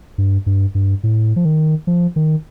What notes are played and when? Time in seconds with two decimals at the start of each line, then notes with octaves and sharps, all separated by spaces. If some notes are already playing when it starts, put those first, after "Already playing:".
0.18 G2
0.46 G2
0.75 G2
1.03 A2
1.36 F3
1.45 D#3
1.87 F3
2.16 D#3